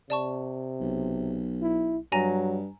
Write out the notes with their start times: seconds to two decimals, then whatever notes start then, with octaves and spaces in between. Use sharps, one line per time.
0.10 C3 D5 A5 C#6
0.80 B1
1.62 E4
2.12 G2 F#3 G#5 A#5 A#6